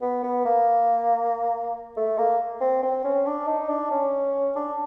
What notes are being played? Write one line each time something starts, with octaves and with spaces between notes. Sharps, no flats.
B3
B3
A#3
A3
A#3
C4
C4
C#4
D4
D#4
D4
C#4
D4